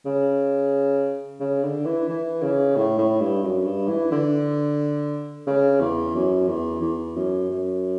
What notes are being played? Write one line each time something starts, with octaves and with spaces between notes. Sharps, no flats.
C#3
C#3
D3
E3
E3
C#3
A2
A2
G2
F#2
G2
E3
D3
C#3
E2
F#2
E2
E2
F#2
F#2